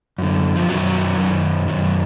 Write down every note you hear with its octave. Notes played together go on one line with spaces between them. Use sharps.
F#2 D3
F3
F#2 D#3 F#3
F#2 D#3
F#2 D#3